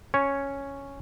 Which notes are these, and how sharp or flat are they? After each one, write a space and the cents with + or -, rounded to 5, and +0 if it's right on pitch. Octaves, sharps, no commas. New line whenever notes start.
C#4 +0 C#5 +0